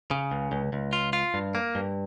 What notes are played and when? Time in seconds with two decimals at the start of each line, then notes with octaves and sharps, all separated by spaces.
0.11 C#3
0.31 C#2
0.52 C#2
0.73 C#2
0.93 F4
1.13 F4
1.34 G2
1.55 A#3
1.75 G2